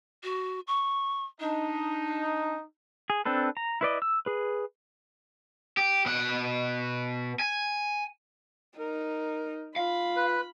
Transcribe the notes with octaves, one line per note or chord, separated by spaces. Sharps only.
F#4
C#6
D4 D#4
G#4
C4 D4 A4 B4
A#5
E4 B4 D5 D#5
E6
G#4 B4
G4
B2 F#5
G#5
D#4 A#4
F4 F5 B5
B4